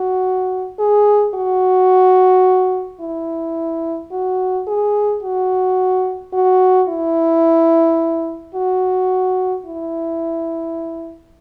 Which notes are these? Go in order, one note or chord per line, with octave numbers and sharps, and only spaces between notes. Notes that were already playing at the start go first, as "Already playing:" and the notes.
Already playing: F#4
G#4
F#4
E4
F#4
G#4
F#4
F#4
E4
F#4
E4